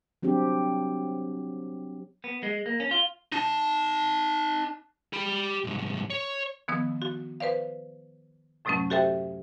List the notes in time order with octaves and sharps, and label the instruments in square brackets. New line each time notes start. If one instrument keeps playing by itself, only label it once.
[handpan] F#3 C4 D4 G4
[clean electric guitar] B3
G#3
A#3
C#4
F4
[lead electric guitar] D#4 A5
G4 B5
C2 G#2
C#5
[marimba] D#3 F3 B3 D#6 E6
F#4
B4 C5 D5 F5
F#2 A2 C3 F#3 A3 C#4
F#4 G4 A4 C5 E5 G5